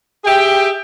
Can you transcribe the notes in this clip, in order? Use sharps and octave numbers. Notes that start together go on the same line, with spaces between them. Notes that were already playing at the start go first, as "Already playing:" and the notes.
G4 G#4 E5 G5